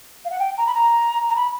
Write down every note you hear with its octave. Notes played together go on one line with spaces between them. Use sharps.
F5
F#5
G5
A#5
B5
A#5
A#5
B5